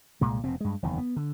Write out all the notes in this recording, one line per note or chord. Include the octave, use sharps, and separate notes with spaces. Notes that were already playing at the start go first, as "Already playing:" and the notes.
C2 A#2 G#3
F1 B2 C4
G2 G#3
F#1 E2 D#3
B3
D3